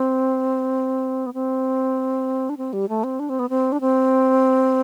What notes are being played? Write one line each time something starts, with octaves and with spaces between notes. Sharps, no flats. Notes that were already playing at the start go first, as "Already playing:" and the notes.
Already playing: C4
B3
C4
D4
C4
G3
A3
C4
D4
C4
B3
C4
D4
C4